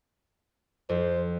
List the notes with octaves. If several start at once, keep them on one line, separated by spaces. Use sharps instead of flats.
F2 C5